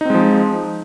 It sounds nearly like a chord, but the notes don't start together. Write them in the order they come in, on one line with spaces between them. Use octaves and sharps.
D#4 C4 G#3 F3